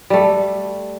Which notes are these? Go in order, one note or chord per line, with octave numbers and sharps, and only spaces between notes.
G3 A3